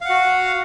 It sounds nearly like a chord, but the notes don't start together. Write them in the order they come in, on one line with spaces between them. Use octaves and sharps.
F5 F#5 F#4